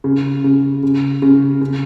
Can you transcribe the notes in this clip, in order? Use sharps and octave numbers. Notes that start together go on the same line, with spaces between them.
C#3
C#3
C#3
C#3
C#3